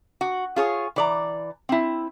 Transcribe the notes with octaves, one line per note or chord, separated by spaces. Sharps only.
F#4
F4 G#4 C#5
E3 D5 A#5
C4 E4